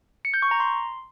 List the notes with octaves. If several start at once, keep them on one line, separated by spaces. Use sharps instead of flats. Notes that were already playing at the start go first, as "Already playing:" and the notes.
C#7
G6
C#6
A#5
C6